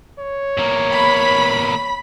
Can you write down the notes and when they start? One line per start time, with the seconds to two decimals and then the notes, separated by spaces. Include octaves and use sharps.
0.19 C#5
0.57 E2 A#3
0.92 B5